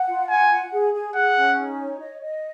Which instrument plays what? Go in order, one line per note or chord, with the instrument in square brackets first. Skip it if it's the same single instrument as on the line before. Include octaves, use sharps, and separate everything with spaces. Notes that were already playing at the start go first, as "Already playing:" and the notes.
Already playing: [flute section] F#5
F4
[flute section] F#5 [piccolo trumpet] G#5
[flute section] F#5
G#4
G#4
[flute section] G#4 [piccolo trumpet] F#5
[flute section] C#4
D#4
C#5
D#5
D#5